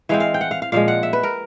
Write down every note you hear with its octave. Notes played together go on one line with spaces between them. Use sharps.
E3 G#3 C4 F5
F5
G5
F#5
F5
F5
A#2 F3 G#3 F5
F#5
E5
B4
A#4